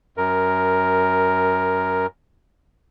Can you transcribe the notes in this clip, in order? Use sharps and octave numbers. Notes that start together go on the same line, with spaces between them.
F#2 A#4